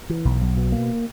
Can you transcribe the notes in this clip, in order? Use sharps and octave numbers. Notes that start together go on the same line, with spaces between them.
E3
B1
B1
B2
A#3